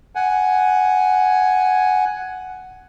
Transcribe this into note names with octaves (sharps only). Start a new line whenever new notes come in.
F#5 G#5